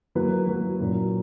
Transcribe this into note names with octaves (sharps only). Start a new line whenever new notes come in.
F#3 A#3 E4 B4
F#3 A#3 E4 B4
A#2 F#3 C#4 E4 A#4